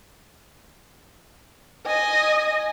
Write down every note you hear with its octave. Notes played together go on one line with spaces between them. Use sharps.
D#5 G#5